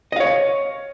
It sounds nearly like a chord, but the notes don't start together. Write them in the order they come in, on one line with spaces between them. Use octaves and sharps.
D#5 F5 C#5